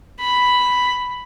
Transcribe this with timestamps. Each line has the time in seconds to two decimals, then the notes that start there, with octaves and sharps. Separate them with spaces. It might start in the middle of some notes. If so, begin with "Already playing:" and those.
0.20 B5